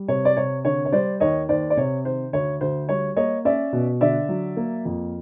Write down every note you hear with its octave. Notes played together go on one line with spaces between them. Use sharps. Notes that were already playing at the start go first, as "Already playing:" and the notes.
Already playing: G3
C3 C#5
D5
C3 C#5
D3 C#5
C#5
G3 C5 D5
D#2 C#5 D#5
D#2 C5 D5
D5
C3 C#5
D#3 C5
D2 C#5
D2 C5
G3 C#5
A#3 C#5 D#5
C#4 D5 E5
B2
D3 D5 E5
F#3
A#3
F2